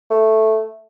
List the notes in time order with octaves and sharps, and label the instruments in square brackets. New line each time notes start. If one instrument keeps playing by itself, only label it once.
[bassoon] A3